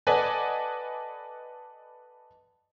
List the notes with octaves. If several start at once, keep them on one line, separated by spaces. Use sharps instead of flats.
A4 B4 D5 D#5 F#5 G#5